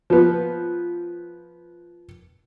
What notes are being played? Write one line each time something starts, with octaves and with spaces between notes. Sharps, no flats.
F3 B3